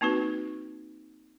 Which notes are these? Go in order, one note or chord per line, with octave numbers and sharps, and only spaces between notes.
A#3 C4 D#4 F#4 B4